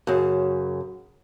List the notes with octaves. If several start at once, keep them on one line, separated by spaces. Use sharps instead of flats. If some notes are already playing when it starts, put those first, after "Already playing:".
F#2 C#3